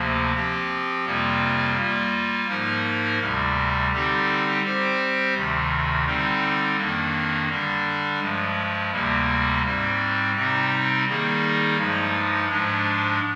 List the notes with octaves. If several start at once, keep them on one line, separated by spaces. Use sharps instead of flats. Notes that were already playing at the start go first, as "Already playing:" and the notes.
Already playing: D2 C3 F3 A#3
F3 C4 G4
F2 C3 G3 A#3 F4
G3 A#3 F4
G#2 F3 A#3 D#4 A#4
D2 C3 G3
D3 G3 C4 D#4 G4
G3 C4 G4 C5
D2 C3 D#3
D3 G3 C4 D#4
F2 D#3 A#3 D4
D3 G3 D4
G2 F3 G#3
D2 C3 G3 A#3
G#2 G3 C4
C3 G3 C4 D#4
D#3 G3 A#3 D#4 G#4
G2 F3 G#3 D#4
G#2 F3 G#3 D4